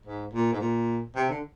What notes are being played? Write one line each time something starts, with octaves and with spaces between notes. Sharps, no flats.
G#2
A#2
G#2
A#2
C3
D3